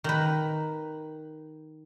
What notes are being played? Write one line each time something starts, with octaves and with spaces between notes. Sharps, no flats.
D#3 B4